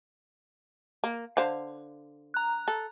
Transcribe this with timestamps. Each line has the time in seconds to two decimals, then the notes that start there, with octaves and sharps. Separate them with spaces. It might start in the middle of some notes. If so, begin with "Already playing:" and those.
1.04 A#3
1.37 D3 C5 F5
2.34 A#5 F#6
2.68 A4